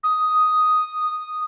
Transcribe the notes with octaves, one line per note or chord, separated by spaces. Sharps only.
D#6